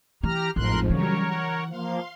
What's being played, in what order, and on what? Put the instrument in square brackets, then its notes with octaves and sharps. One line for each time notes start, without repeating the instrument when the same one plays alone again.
[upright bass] E3 [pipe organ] G4 A#5 F6
[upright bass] A1 [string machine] F2 G#2 F3 [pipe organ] A#4 C6 F#6
[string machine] C#3 F#3 G3 [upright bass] E3 [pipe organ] A#4 C#5
[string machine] F#5
[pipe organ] F3 A#3 [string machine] F5 C6